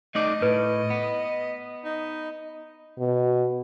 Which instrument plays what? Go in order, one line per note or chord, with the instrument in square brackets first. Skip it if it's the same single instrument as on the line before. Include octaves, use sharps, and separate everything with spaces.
[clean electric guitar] A3 D#4 D5 [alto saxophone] D#5
[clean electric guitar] A2 [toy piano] B4
[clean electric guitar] B3
[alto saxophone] D#4
[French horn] B2